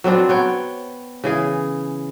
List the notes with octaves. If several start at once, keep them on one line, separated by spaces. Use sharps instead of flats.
F#3 B3 C4 D4
B3 C#5 G5
C#3 E3 G#4